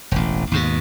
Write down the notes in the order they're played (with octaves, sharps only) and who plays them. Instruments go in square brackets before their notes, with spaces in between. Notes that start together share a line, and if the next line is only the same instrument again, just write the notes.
[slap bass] E1 A1
D#2 G#2 B2